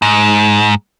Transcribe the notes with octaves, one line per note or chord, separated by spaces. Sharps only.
G#2